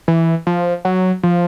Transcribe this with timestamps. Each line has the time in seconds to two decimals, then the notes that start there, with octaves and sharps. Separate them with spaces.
0.08 E3
0.47 F3
0.85 F#3
1.23 F3